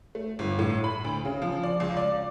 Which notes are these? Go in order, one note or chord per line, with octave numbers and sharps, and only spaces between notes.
A3
G1
A2
B5
D2
C#3
F3
D5
C#2
D5